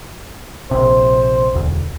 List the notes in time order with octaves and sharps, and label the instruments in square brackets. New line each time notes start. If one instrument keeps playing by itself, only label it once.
[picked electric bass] A#1 C3 [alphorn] C5
[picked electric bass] E1 D2